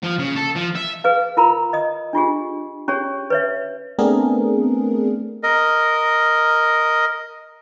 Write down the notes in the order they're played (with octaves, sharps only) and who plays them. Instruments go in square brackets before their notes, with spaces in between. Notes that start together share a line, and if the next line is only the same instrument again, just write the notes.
[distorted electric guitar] F3
C#3
A4
F3
E5
[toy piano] G#4 B4 F5
F4 A#4 A#5 B5
D#5 D#6
D4 F4 G4 G#4
C#4 G4 G#4 C#5
B4 C#5 E5
[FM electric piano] A3 B3 C4 D4 G#4 A#4
[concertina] A#4 D#5